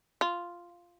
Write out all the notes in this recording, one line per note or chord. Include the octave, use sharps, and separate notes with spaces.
F4